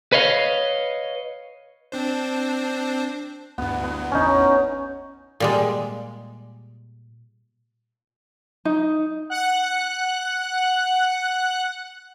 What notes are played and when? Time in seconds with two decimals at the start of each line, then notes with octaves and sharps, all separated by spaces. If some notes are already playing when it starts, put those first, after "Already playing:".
0.12 B4 C#5 D#5 F5
1.92 C4 D4 C5
3.58 D2 G2 B3
3.84 B3
4.12 A1 E2 C#4 D#4
5.40 A#2 G3 G#3
8.65 D#4
9.30 F#5 F#6